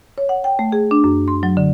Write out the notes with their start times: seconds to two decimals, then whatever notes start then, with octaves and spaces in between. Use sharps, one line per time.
0.18 C#5
0.29 F#5
0.44 G5
0.59 A3
0.72 G#4
0.91 D4
1.04 F#2
1.28 C6
1.43 F#3
1.57 D3